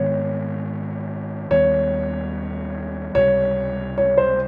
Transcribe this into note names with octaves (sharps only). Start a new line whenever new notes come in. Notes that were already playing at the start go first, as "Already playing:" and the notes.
Already playing: G#2 D#3 G#3 B3 C#5
D#2 D#3 G3 B3 C#5
C#2 C3 D#3 G3 C#5
C#5
C5